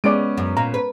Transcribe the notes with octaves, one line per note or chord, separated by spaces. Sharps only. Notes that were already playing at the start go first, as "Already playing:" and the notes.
G#3 B3 C#4 D5 D7
F#2
A#2 A#5
B4